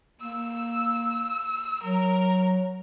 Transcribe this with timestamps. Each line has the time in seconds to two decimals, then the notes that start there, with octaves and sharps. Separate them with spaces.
0.22 A#3 E6
1.83 F#3 A#4